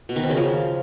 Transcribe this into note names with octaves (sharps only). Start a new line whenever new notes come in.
B2
D#3
C4
C#3
F3